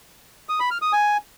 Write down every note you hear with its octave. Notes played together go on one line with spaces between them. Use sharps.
D#6
B5
F6
D#6
G#5